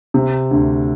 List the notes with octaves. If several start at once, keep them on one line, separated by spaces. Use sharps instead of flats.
C3
D2